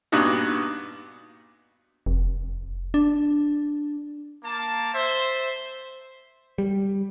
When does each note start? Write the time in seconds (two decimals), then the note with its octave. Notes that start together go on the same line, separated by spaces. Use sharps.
0.12 G2 A#2 B3 D4 D#4 F#4
2.06 F1
2.94 D4
4.44 A#3 A5
4.94 C5 E5
6.58 G3